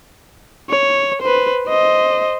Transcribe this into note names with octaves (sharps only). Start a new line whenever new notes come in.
C#5
B4 C5
C5 D#5